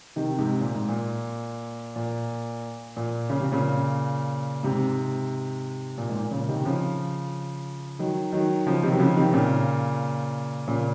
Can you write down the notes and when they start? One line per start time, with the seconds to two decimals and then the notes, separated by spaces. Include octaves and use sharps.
0.16 C3 D#3
0.39 G#2 C3
0.61 A#2
0.75 G#2
0.88 A#2
1.96 A#2
2.96 A#2
3.29 C#3
3.41 C3
3.52 A#2 C#3
4.63 G#2 C3
5.98 A#2
6.09 G#2
6.15 A#2
6.31 A#2 C#3
6.48 C3 D#3
6.65 C#3 F3
7.99 D#3 F#3
8.32 D#3 F#3
8.66 C#3 F3
8.83 C3 D#3
8.92 F#3
9.00 C#3 F3
9.17 C3 D#3
9.33 A#2 C#3
10.67 A#2 C#3